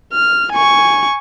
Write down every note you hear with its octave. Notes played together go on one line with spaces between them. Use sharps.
F6
G#5 C#6